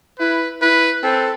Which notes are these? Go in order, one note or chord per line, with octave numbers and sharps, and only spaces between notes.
E4 B4
E4 B4
C4 A4